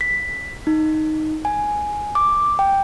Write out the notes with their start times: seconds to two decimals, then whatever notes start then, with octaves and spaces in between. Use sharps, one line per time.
0.01 B6
0.67 D#4
1.45 G#5
2.15 D6
2.59 G5